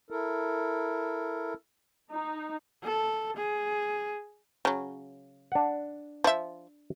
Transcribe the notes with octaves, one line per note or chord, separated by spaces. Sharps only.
E4 A4 A#4
D#4
A4
G#4
C#3 F#3
D4 F#5
F3 E5